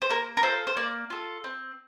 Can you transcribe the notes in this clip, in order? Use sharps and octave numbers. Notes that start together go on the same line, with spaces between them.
C5
A#3 A#4
A#4
F4 A4 C5
C5
A#3 D5
F4 A4
C4